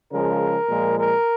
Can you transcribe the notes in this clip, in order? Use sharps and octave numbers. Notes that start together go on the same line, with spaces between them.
C#3 F3 G#3 A#4
A#2 F3 G#3
A#4